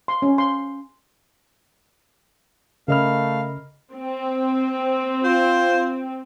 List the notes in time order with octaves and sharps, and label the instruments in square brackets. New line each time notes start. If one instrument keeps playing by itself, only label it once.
[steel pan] C6
C#4
C6
[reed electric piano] C#3 F6 [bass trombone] A3 [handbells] A#4 D#5 B5 [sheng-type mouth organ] F5
[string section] C4
[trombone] F4 [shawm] C5